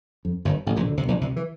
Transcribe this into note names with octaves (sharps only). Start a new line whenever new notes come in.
F2
G1 G2
A1 A2
A#1 A#2
D2 D3
C2 C3
A#1 A#2
C2 C3
E3